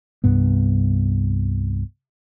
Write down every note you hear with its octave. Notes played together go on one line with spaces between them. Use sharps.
C2 G2 B3